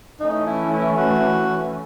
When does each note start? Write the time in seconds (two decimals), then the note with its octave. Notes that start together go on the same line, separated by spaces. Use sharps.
0.20 E3 A3 C#4 D#4
0.46 E4
0.72 E4
0.97 F#4